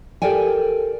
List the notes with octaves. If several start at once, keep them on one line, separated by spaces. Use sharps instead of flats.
G4 A4 A#4 D5 G5 G#5